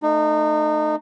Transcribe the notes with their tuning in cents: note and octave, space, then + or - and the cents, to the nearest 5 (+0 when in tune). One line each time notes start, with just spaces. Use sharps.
A3 +0 D#4 -30